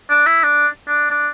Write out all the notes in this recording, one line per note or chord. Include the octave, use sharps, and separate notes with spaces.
D4
E4
D4
D4
D4